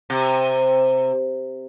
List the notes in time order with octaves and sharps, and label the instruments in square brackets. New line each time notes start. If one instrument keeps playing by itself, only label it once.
[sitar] C3